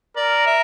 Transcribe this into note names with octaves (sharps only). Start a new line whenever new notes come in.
A#4 D5
E5